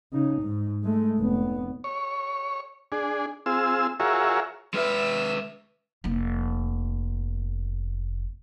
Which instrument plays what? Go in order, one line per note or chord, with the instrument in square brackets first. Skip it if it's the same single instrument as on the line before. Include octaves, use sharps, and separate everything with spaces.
[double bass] C#3 D#4
G#2
G#3 A3
F1 B3
[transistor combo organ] C#5
D4 G#4
C4 F4 G#4 E6
F4 F#4 G#4 A#4 C#5 E5
[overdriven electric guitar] G#3 B4 [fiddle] E5
[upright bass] F1 A#3